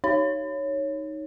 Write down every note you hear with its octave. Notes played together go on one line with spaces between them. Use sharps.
D#4 C#5